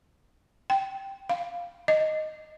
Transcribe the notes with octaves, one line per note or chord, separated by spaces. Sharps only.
G5
F5
D#5